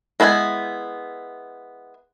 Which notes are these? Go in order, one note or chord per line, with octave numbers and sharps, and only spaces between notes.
G#3 B3 E4 A#4 G#5